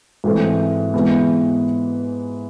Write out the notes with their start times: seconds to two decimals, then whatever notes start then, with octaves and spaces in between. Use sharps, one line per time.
0.24 G#2 E3 A3 C4
0.94 G#2 E3 G#3 B3